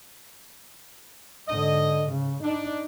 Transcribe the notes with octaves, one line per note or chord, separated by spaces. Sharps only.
G#2 D3 D#5
C#3
D4 D#4